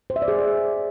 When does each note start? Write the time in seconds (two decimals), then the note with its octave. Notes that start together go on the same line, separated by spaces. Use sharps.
0.10 C5
0.16 E5
0.22 D5
0.28 G#4